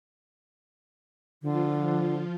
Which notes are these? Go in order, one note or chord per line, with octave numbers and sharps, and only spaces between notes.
D3 F3 F4